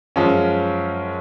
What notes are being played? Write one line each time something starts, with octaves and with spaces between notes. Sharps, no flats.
F#2 F3 G#3 C#4